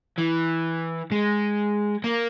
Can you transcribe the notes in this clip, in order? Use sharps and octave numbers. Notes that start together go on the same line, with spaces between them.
E3
G#3
A#3